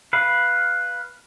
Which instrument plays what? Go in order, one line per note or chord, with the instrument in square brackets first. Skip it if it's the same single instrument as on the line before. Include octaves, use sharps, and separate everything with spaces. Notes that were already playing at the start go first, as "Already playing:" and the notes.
[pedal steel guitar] B4 F5